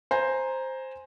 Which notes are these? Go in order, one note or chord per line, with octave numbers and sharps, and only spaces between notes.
C5 G#5 A#5